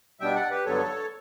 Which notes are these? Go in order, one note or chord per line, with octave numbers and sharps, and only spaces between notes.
B2 G3 B3 D4 E5 G5
D5 F#5
G4 B4
G2 D3 F#3 B3 A4 C#5